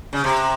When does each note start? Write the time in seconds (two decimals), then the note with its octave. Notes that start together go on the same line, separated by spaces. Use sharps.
0.13 C#3
0.24 C3